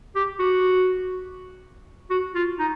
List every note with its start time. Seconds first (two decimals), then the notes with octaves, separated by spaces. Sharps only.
0.15 G4
0.39 F#4
2.10 F#4
2.35 F4
2.59 D#4